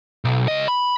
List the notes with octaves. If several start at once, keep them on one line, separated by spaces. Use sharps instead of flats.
B1
C#2 D#5
B5